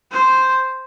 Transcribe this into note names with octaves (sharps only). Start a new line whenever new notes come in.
C5